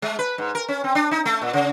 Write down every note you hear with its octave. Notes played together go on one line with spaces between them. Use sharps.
G#3
B4
G#2
A#4
C#4
C4
D4
D#4
A3
A#2
C#3